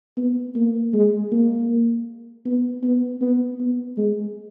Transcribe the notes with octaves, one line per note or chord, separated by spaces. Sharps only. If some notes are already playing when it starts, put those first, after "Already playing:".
B3
A#3
G#3
A#3
B3
B3
B3
B3
G#3